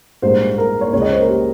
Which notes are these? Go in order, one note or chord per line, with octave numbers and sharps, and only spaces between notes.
A#1 G#2 G3 A#3 C5
A#4
C#5
C#2 C#3 G#3 C#5
D#5
C5
A#4
G4